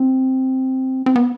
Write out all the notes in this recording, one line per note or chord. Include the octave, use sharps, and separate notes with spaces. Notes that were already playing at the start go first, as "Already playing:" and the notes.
Already playing: C4
C4
B3